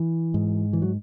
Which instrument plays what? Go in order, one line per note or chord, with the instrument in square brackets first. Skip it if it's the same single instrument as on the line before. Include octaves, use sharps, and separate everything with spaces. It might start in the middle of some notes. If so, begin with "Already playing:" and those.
Already playing: [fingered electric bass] E3
G#2
E3
F#3